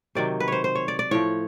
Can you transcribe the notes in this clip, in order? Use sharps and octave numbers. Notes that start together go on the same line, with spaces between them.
C3 D#3 F#3 D5
B4
C5 C#5
C5
C#5
D5
D5
A2 F3 C#5